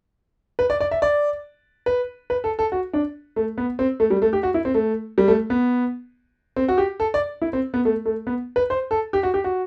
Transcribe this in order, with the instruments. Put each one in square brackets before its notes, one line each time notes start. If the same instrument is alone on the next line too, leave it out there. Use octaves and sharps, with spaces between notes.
[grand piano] B4
D5
D5
E5
D5
B4
B4
A4
A4
F#4
D4
A3
B3
C4
A3
G3
A3
G4
F#4
E4
C4
A3
G3
A3
B3
C4
F#4
G4
A4
D5
E4
C4
B3
A3
A3
B3
B4
C5
A4
G4
F#4
G4
F#4